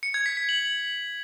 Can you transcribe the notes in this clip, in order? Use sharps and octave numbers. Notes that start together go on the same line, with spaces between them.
C#7
G#6
B6
B6
F#7